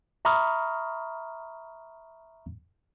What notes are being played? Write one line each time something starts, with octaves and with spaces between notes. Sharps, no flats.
E5 A#5 B5 C#6 D#6 F6